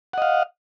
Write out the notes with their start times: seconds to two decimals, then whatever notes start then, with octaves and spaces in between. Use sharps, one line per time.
0.13 F#5
0.18 D#5
0.22 F5